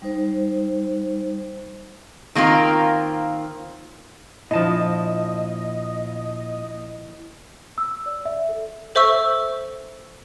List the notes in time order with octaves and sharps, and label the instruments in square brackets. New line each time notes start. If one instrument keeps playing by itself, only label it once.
[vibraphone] G3 D#4 C5
[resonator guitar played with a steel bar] D#3 A#3 C4 F4
[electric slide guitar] A#2 A5 [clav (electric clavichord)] F3 D4 [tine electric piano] E4 [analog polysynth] D#5
[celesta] E6
D5
E5
A4
[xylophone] A4 C5 E5 C#6 E6